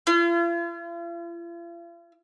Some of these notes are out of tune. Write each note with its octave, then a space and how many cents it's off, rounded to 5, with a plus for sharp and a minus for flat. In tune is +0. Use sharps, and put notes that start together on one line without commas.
F4 -45